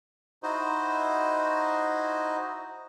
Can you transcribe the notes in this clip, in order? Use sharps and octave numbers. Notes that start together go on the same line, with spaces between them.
D#4 E4 F#4 C5 D#5